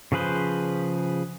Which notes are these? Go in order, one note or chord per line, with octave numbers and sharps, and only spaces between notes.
C#3 F3 G#4 B4 C5